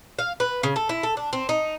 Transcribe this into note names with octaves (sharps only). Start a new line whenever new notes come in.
F5
B4
C#3
A4
E4
A4
D4
C4
D#4